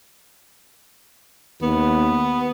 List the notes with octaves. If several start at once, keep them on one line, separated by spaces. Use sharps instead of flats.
D#2 B3